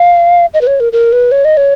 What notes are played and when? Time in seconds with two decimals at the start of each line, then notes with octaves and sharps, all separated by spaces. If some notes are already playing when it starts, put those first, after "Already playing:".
Already playing: F5
0.54 D#5
0.61 B4
0.67 C#5
0.80 A#4
0.93 A#4
1.13 B4
1.32 C#5
1.45 D#5
1.57 C#5